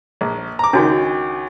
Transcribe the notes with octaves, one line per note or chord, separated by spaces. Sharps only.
A#1
A#5 D6
C#2 D#3 D4 F#4 G#5